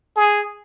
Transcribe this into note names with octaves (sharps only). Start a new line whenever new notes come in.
G#4